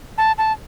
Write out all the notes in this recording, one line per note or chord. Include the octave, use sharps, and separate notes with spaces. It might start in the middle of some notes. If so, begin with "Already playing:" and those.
A5
A5